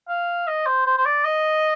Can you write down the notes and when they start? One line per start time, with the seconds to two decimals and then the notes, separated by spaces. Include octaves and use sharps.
0.08 F5
0.47 D#5
0.66 C5
0.86 C5
0.98 C5
1.05 D5
1.25 D#5